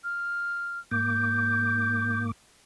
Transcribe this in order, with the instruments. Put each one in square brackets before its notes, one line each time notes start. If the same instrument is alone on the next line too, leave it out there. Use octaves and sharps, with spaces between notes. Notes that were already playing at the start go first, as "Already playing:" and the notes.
[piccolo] F6
[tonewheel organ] G#2 A#3 D6 [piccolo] G6